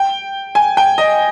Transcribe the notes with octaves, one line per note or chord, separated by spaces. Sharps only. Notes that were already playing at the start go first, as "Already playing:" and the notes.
Already playing: G5
G#5
G5
D#5